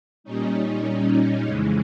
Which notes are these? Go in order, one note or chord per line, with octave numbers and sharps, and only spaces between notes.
A#2 G3 C#4 D#4
F2 C#3 E3 G#3